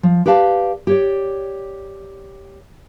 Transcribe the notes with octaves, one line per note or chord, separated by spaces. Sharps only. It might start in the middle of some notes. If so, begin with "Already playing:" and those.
F3
G4 B4 D5 F5 A5
G4 C#5 D5